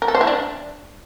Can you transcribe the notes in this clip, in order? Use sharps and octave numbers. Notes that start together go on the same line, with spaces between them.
A#4
A4
C5
E4
D4